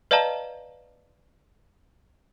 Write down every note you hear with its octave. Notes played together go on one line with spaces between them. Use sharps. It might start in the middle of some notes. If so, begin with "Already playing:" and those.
B4 D5 D#5 F5 A5 A#5